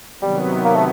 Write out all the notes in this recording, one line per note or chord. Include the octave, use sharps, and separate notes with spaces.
C3 D#3 F#3 G3 B3
A#3
A3